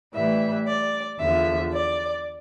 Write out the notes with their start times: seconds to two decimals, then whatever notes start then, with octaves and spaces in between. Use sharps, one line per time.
0.13 A2 E3 G3 E5
0.67 D5
1.19 E2 D3 F3 E5
1.72 D5